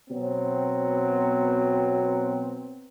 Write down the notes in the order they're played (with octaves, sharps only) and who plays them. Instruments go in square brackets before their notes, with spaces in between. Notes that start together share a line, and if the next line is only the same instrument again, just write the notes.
[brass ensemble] B2 F#3 B3 C4